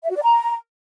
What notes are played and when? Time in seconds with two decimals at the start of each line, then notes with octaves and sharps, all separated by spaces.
0.03 E5
0.10 F#4
0.16 D5
0.22 A#5